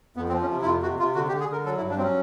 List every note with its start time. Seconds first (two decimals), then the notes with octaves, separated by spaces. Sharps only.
0.17 F2 B3
0.29 C4
0.32 F3
0.41 C#4
0.50 C3
0.62 E4
0.65 F2 F4
0.82 C3 F#4
0.99 C3 F4
1.15 D3 F#4
1.28 G4
1.32 D3
1.40 G#4
1.49 D3 A#4
1.65 F#3 A4
1.77 E4
1.81 G2
1.90 D4
1.98 F#3 C4 C#4